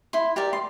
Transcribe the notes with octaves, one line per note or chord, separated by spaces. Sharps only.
E4 C6
G4 A#4 D5
C6